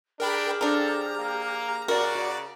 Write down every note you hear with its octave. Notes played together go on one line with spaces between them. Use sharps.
D4 G4 G#4 A#4 G5 B5 F6
F3 D4 A4 A#5
A#3
C#3 F#4 A#4 D5